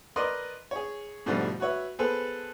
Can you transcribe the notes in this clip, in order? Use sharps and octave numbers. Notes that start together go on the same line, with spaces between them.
A#4 B4 D5 D#5 C6
G#4 C#5
G#2 B2 D3 F3 G3 A3
F#4 B4 C#5 E5
B3 G#4 A4 B4 C5